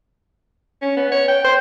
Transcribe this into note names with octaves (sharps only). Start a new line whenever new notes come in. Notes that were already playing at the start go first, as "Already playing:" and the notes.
C#4
B3
C#5
G5
C5